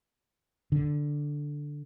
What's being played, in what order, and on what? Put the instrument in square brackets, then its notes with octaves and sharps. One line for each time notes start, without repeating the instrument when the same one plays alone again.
[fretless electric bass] D3